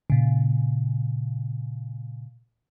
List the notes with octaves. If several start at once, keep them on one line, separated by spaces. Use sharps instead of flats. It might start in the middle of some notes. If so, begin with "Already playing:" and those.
A#2 C#3